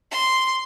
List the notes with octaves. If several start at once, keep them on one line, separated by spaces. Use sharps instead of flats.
C6